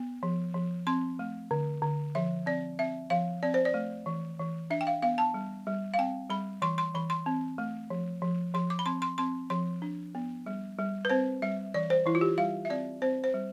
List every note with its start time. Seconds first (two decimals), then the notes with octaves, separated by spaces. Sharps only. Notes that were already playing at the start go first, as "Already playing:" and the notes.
Already playing: B3
0.23 F3
0.54 F3
0.87 C4 C6
1.19 A3
1.51 D3
1.82 D3
2.15 F3 E5
2.46 C4 D5
2.79 C4 E5
3.10 F3 F5
3.43 C4 D5
3.54 C5
3.65 D5
3.74 A3
4.06 E3
4.39 E3
4.70 D4 E5
4.81 G5
4.87 F5
5.02 B3 F5
5.18 A5
5.34 G3
5.67 G3
5.94 F5
5.98 C4 G5
6.30 G3 B5
6.62 E3 C6
6.78 C6
6.94 E3 B5
7.10 C6
7.26 C4
7.58 A3
7.90 F3
8.22 F3
8.54 F3 C6
8.70 D6
8.79 B5
8.86 C4 C6
9.02 C6
9.18 C4 C6
9.50 F3 C6
9.82 D4
10.15 B3
10.46 G3
10.78 G3
11.05 B4
11.10 C4 C5
11.42 G3 E5
11.74 E3 D5
11.90 C5
12.06 E3 E4
12.15 F4
12.21 G4
12.38 G3 F5
12.65 E5
12.70 C4 D5
13.02 C4 C5
13.24 C5
13.34 G3